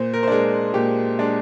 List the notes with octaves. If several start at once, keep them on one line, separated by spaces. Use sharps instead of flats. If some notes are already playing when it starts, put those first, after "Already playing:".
Already playing: A#2 C5
A#4
C5
G#3 D4 A#4
A#2 G4
G#3 D4